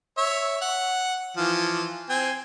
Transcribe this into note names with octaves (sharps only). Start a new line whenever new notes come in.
C#5 E5
F#5
E3 F3
C4 G#5